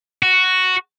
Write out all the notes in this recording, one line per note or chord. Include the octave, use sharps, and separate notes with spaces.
F#4